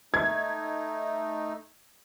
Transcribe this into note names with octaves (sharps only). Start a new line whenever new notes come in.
A3 D#4 G#6